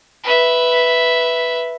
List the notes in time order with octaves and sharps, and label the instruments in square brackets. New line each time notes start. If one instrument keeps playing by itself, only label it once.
[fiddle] B4 E5